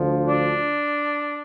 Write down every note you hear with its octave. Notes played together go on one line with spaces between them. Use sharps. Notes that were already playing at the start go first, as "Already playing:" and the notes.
Already playing: D2 D3 F3
D4